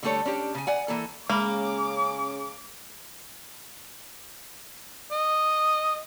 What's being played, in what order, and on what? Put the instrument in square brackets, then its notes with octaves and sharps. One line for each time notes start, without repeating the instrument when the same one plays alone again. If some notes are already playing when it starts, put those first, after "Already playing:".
[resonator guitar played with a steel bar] D3 G3 A3 A4 C#5
C#4 D4 G4
C#3 G#5
D5 F#5 G#5
E3 A#3 A4
[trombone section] C#3 C#4 G#4 [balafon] G#3 B5 [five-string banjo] A#3 [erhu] D6
[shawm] D#5